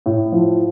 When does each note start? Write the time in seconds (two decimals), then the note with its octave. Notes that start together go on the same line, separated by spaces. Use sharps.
0.06 A2
0.32 F3